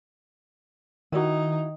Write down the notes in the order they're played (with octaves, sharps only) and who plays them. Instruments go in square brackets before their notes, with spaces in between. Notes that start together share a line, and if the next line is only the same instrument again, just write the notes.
[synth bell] D#3 [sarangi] D#4 [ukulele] E4 F#4